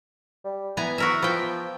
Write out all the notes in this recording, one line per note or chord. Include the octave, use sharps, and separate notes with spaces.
G3
E3 B3 G#5 A#5
F#4 A#4 E5
F3 B3 G5